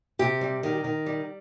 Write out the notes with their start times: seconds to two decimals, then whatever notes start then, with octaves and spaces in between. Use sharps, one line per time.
0.19 C3 G4
0.41 G3
0.63 D#3
0.84 D#3
1.06 G3